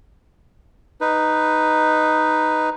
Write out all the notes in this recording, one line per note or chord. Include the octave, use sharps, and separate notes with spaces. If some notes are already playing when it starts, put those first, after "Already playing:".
D#4 B4